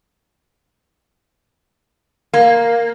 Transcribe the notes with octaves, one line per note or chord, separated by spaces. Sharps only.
A#3